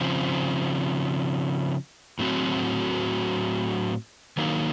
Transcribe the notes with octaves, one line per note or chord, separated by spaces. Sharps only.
C#3 F3 C4
A2 F#3 C4 F#4
D#3 F#3 A#3 D#4